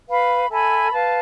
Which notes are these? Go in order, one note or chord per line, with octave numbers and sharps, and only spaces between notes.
B4 F5 B5
A4 E5 G#5 B5
B4 F5 A5